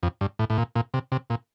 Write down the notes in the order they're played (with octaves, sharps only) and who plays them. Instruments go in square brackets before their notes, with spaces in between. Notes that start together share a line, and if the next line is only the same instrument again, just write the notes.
[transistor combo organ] F2
G2
A2
A2
A#2
A#2
C3
C3
A#2